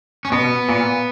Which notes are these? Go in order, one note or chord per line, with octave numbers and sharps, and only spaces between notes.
C#4
B2 B3
A#2